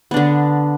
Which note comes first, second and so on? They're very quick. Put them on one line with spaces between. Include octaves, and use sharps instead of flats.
B3 D4 D3